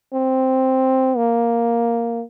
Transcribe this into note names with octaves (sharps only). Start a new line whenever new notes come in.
C4
A#3